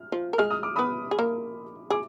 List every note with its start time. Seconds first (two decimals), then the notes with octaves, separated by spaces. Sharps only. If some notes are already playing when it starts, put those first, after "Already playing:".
Already playing: F6
0.12 F3 F4
0.33 A#4
0.38 G#3 G#4 F6
0.50 D#6
0.63 D6
0.76 B3 B4 B5 D#6
1.11 G#4
1.19 A#3 A#4
1.90 G#4 D6